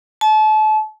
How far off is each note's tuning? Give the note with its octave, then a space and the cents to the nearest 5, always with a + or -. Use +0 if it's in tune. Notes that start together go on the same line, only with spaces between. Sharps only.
A5 -35